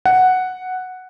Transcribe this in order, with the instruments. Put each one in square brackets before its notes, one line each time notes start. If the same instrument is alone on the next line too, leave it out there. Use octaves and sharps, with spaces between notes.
[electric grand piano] F#5